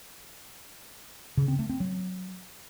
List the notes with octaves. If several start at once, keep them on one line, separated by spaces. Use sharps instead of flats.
C#3
C4
A3
C4
F#3